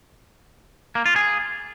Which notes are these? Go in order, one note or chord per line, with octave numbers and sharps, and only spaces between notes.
A#3
F4
G#4